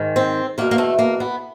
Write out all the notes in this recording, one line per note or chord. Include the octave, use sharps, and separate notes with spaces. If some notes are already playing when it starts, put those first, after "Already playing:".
Already playing: G#2 D#3
C4
E2 B2 A#3
A#3
A3
A#3
B3